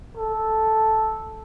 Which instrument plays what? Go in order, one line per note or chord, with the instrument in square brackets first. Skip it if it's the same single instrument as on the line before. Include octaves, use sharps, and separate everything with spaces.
[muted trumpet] A4